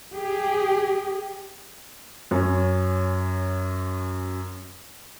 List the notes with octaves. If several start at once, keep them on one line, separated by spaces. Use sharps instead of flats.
G4 G#4
F#2 C#4